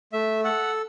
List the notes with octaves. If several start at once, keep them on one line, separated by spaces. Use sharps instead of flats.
A3 E5
A4 F#5